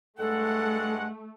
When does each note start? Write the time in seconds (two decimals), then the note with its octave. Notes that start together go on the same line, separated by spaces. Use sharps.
0.18 G2 G#3 A3 A4 F#5